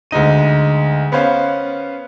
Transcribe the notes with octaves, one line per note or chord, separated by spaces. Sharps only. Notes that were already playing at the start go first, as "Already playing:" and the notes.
D2 G#3 D#4 D#7
B3 C#4 B4 C5 F5